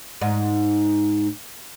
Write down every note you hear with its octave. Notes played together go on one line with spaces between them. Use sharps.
G#2 D#4